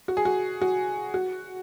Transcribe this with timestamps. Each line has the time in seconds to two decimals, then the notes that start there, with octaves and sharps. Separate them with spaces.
0.08 F#4
0.17 G#4
0.25 F#4
0.62 F#4
1.14 F#4